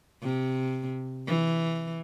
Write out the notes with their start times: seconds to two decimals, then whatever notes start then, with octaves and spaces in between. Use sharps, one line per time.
0.22 C3
1.27 E3